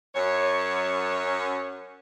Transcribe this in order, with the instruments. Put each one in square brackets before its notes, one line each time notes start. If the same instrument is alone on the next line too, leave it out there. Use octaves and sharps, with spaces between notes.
[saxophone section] F#2 C#5